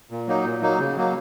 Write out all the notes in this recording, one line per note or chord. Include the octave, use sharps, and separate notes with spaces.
A#2
F#3 A#3 D#4
A#2
F#3 A#3 D#4
C#3
F#3 A#3